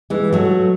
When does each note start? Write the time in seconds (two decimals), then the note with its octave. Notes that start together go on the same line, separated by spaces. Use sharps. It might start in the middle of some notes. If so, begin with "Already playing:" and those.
0.10 E3 G#3
0.33 F#3 A3